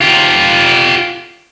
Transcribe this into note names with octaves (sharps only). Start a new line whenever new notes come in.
F4 G4